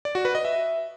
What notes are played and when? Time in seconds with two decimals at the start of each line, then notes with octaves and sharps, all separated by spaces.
0.05 D5
0.15 F#4
0.25 B4
0.35 D#5
0.45 E5